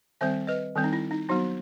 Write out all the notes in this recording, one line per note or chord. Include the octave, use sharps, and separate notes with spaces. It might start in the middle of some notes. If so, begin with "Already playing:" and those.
D#3 G3 C4 C5 E5
B4 D#5
D#3 G3 C4
D#4
E4
D#4
F#3 B3 D#4 F#4